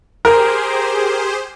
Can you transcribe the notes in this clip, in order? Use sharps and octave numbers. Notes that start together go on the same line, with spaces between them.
G4 G#4 A#4 C5